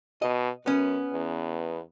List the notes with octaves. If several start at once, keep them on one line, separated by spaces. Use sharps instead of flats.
B2 D#5
F#2 B3 C#4
E2